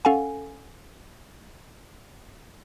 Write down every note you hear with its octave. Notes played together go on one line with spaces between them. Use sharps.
C#4 A4 F5 F#5 G#5